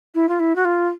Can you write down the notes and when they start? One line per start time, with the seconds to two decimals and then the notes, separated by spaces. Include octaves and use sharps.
0.14 E4
0.29 F4
0.39 E4
0.55 F#4
0.65 F4